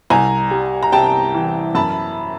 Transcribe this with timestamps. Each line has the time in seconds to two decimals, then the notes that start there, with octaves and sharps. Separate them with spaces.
0.10 C2 G#5 A#5
0.51 G3
0.83 A#5
0.92 C3 G5 A5
1.34 E3
1.75 F#2 A5 B5